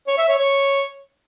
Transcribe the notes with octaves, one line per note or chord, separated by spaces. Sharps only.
C#5
E5
C#5
C#5